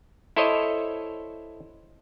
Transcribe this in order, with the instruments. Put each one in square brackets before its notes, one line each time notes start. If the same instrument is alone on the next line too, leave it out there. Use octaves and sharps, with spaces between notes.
[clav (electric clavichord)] E4 A4 C5 C#5 D#5